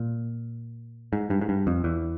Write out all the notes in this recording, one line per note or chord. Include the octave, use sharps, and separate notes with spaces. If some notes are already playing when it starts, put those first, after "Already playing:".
Already playing: A#2
G#2
G2
G#2
G2
F2
E2